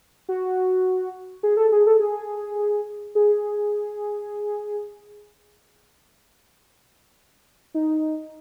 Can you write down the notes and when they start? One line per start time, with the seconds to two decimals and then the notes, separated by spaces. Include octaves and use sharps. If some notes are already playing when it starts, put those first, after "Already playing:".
0.29 F#4
1.43 G#4
1.57 A4
1.72 G#4
1.87 A4
2.00 G#4
3.15 G#4
7.74 D#4